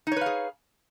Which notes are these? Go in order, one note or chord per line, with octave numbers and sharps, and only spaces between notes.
D#4 G#4 B4 C#5 F5